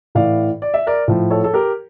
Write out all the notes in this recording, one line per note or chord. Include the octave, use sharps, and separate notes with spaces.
A2 E3 D5 F5
D5
E5
A#4 D5
A2 F3
A4 C#5
A4
G4 A#4